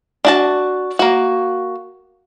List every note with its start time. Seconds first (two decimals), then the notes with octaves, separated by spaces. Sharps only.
0.25 D4 F#4 A5
0.99 A#3 F#4